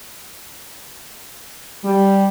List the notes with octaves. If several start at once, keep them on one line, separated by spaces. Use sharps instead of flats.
G3